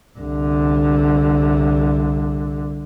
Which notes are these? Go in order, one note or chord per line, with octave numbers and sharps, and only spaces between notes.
C2 D3